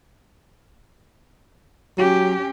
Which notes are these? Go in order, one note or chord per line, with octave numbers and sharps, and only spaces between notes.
F#3 C#4 G4